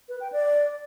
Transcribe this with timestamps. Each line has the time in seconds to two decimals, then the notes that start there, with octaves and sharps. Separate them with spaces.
0.09 B4
0.21 G5
0.32 D5